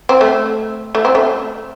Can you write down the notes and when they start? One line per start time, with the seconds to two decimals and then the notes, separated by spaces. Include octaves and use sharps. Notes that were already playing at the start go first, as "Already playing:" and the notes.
0.09 C4
0.21 A3
0.95 A3
1.05 C4
1.15 A3